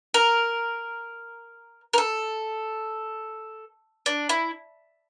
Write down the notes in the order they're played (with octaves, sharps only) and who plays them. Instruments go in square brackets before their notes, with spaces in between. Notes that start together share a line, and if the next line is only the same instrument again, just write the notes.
[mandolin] A#4
A#4
A4
D4
E4